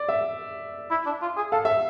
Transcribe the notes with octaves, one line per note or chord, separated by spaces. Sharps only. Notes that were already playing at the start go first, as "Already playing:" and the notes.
Already playing: D5
E5
E4
D4
F4
G#4
A4 F5
E5